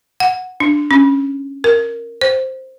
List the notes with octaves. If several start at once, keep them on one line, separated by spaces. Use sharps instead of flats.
F#5
D4
C#4
A#4
C5